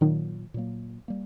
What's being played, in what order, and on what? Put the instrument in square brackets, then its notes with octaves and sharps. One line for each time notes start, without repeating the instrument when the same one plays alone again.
[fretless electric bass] A#2 F#3 A#3 [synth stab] D#3
[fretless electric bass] A#2 F#3 A#3
G3 A#3